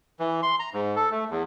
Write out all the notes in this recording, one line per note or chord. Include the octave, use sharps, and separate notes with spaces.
E3
C6
A#5
G#2
A4
A3
E2